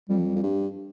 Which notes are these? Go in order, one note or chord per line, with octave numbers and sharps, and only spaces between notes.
F2 G3
F3
G3
F2
G2